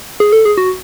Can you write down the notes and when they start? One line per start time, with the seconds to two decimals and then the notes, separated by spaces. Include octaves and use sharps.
0.20 G#4
0.33 A4
0.45 G#4
0.58 F#4